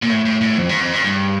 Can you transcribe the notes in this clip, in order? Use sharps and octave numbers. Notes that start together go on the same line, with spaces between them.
A#2
A2
A2
A2
F2
G2
F2
G2
G2